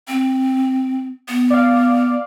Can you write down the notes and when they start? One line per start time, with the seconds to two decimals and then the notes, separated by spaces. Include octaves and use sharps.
0.08 C4
1.28 B3
1.50 D5 F5